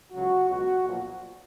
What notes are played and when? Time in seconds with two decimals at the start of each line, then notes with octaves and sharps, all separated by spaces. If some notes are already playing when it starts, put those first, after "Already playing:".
0.13 C#2 C#3 F#3 F#4
0.49 C#2 B2 F#3 F#4
0.84 B1 A#2 F3